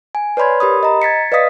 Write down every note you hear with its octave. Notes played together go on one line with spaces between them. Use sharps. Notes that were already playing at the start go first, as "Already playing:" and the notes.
G#5
B4 C#5 D5 B5 C6 G#6
G4 A#4 B5 D#6
D#5 A#5
G#6 A6 B6 C#7
B4 D5 D#5 F5 D#6 B6